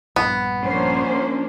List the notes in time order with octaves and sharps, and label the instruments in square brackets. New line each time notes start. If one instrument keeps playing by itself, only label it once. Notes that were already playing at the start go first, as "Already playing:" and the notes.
[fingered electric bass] A#1 G2 [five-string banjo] B3
[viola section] F3 A#3 D4 [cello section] C#4 C5